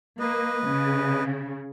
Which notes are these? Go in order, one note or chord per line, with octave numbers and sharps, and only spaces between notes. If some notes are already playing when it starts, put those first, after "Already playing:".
A#3 B4 D#5
C#3